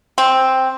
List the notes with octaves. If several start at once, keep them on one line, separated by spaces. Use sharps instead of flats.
C4